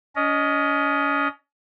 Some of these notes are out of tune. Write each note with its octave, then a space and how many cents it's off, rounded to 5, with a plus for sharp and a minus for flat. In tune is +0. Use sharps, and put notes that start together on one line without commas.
C#4 +35 D#5 +0